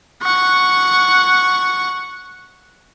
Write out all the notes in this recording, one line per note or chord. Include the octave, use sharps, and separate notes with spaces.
F#5 C#6